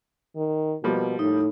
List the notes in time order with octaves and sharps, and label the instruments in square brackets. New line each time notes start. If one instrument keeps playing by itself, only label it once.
[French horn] D#3
[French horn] B2 [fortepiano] F3 G3 A#3
[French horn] A2 [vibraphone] D#4